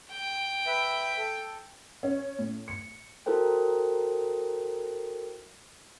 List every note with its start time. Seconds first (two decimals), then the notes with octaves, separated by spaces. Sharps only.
0.10 G5
0.67 B4 E5
1.17 A4
2.03 C#4
2.39 A2
2.68 C#7
3.26 E4 F#4 A4 A#4 C5 G5